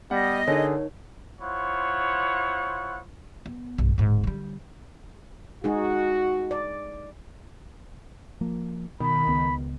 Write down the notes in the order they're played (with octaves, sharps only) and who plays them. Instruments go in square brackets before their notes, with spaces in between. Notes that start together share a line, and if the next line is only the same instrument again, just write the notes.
[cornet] G3 [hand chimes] B3 [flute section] D#5 [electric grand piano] F#5
[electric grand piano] D3 [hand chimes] D#4 A#4 C#5 [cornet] G#4
[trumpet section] E4 F4 C5 C#5 F#5
[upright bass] B3
B1 G2
D1 G#2
D3 G3
[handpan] G#3 D#4 G#4 [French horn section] F#4
[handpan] D5
[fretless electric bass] F3 A#3
[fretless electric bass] B2 [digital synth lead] D#3 [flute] B5
[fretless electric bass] C#2 B3